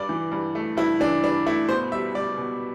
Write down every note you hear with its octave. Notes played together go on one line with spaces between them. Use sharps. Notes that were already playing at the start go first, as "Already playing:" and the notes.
Already playing: G2 D5
E3
G2
A3
G2 E4
E3 D4
G2 D4
A3 E4
B2 C5
G3 E5
G3 D5
B2